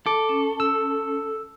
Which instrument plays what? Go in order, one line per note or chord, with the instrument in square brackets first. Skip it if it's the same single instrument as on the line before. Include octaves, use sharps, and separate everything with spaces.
[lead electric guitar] A4 [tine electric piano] D6
[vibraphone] C#4
[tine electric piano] E6